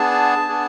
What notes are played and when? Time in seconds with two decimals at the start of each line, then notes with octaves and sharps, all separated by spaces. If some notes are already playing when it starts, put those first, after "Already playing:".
Already playing: B3 D4 G#4 A5
0.48 B3 D4 G#4